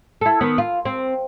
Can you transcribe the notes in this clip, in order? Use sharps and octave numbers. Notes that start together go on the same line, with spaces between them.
E4 A4
D#3 B3
F4
C4